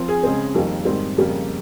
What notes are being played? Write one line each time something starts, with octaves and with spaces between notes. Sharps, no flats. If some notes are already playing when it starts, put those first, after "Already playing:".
Already playing: F3 C4
G#4
C#3 G#3 C4
F2 D#3 G3 A#3
G#2 D#3 G3 C4
F2 C#3 G3 A#3